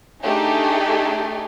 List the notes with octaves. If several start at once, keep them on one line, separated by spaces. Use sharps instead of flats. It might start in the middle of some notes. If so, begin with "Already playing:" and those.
A3 D4 D#4 G4 G#4